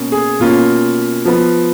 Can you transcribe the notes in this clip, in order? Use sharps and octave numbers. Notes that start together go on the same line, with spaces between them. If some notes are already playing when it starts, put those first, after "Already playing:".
Already playing: B2 A#3 C#4
G#4
B2 A#3 C#4 F4
F3 B3